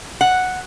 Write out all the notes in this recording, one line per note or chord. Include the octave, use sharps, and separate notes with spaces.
F#5